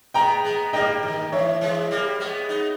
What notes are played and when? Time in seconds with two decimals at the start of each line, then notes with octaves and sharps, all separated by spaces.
0.14 G#3 B3 G5 A#5
0.44 G#3 B3
0.73 G3 A#3 D#5 G5
1.03 D#3
1.32 E3 C#5 E5
1.61 E3 G#3
1.91 G3 A#3
2.20 G#3 B3
2.49 B3 D#4